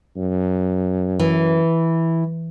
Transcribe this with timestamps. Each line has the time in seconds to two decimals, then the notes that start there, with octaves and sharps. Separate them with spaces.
0.17 F#2
1.19 E3